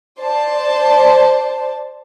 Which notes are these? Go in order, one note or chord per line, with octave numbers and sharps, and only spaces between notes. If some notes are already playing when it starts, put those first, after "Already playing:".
C5 D5 A5